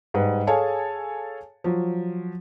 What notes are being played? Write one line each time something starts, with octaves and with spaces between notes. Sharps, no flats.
G#2 G3 B4
G#4 A4 C#5 F5 G#5 A5
F3 F#3